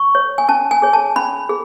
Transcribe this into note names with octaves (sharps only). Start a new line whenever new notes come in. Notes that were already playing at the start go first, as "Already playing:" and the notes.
Already playing: C#6
C#5
G#5
C#4 A5
G#5
G#4 C#5
A5
C#4 B5
G#4